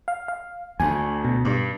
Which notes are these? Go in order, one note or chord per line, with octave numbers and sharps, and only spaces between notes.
F5
F5
D2 G#5
B2
G2